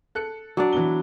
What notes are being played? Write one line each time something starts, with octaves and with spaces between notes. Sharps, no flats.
A4 F#6 C#7
F#3 D4 D5
E3 B3 G7